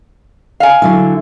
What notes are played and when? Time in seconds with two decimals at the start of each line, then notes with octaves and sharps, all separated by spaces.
0.60 F5 G#5
0.82 D3 F#3 E4